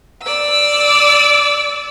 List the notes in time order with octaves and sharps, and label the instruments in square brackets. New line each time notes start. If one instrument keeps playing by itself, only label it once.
[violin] D5 E6